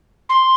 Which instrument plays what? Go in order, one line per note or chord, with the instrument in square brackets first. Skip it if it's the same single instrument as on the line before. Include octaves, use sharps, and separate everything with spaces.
[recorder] C6